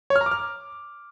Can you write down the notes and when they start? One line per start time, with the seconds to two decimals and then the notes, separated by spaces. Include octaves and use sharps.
0.10 C#5
0.16 F6
0.21 A#5
0.26 D6
0.31 F6